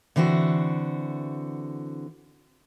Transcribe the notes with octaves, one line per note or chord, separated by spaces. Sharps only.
D3 E3 C4 F#4